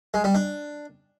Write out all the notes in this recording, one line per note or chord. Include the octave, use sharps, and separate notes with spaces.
G#3
G3
D4